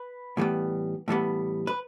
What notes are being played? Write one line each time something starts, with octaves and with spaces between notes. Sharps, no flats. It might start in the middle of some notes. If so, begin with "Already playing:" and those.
Already playing: B4
A2 E3 G3 B3
A2 E3 G3 B3
B4